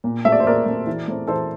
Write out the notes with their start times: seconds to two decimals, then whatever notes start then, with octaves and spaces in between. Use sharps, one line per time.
0.04 A#2
0.25 A3 C4 E5
0.32 D5
0.40 C5
0.46 A#2 A#4 D5
0.66 A3 C4
0.87 E3
1.08 A3 C4
1.27 E3 A4 C5